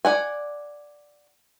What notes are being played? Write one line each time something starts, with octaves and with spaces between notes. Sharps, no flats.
D5 F#5 G#5